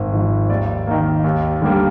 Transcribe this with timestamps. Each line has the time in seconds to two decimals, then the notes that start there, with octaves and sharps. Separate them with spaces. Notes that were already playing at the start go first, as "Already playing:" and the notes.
Already playing: G#1
0.12 G#2 F3
0.50 D#2 D5
0.87 D#3 A#3
1.24 D#2
1.62 D3 G3 A#3